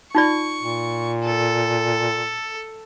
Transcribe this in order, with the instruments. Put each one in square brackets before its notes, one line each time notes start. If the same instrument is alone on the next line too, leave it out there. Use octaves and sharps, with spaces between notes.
[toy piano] D#4 F4 D5 [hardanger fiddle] C#6
[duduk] A#2
[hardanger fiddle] A4